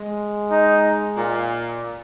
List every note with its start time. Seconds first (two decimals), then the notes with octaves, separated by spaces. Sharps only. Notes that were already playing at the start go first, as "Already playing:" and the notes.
Already playing: G#3
0.51 D#4
1.17 A#2